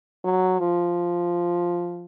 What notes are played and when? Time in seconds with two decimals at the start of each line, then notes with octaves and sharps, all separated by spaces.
0.25 F#3
0.59 F3